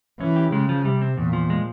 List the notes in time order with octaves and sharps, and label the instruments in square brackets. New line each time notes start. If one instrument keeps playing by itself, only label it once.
[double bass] E3 [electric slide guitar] C#4
[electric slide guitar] G4
[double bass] C#3 [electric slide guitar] G#3
[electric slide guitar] F3
[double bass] C3 [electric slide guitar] G3
[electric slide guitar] C4
[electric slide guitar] E2 [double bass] A#2
[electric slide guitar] F3
G#3